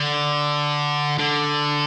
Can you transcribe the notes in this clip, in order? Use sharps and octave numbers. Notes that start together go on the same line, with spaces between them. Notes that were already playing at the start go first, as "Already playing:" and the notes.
Already playing: D3
D3